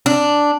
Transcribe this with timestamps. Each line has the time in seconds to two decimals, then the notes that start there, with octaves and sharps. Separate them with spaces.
0.06 D4